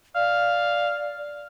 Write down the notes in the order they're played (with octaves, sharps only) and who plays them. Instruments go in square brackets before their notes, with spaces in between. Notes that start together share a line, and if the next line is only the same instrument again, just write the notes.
[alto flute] D5 [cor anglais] F5